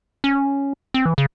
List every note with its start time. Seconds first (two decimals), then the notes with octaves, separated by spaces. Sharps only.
0.24 C#4
0.94 C4
1.06 E3
1.18 C#3